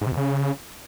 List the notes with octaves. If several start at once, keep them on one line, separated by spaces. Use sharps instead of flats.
G#2
C3
E2
C#3